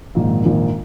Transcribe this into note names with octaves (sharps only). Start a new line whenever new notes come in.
A#1 G#2 D#3 A#3
A#1 G#2 D#3 A#3